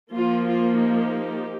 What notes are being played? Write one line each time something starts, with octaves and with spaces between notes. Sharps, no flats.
F3 A#3 F4
F4
D#4 G4